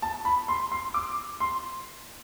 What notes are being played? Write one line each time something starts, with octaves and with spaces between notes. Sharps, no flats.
A5
B5
C6
C6
D6
C6